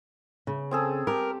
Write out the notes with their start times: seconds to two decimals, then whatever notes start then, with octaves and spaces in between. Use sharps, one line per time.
0.47 C#3
0.71 C4 G#4 A4
1.07 G4 A#4